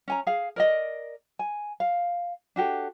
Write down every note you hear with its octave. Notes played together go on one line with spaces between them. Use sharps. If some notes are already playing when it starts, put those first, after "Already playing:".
C#4 G#5 A#5
G#4 F5
A#4 D5 D#5
G#5
F5
D4 F#4 G4 A4